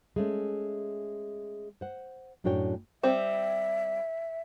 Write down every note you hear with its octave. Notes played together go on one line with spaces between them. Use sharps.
G#3 A3 C#4
C5 F#5
F#2 A2 D4 F#4 C#5 G5
G3 C4 E5